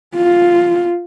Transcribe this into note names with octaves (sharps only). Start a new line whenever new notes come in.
F4